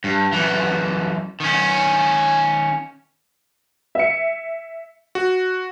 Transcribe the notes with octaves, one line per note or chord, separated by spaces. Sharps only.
G2
F#2 E3
D#3 C#4
E5 C#7
F#4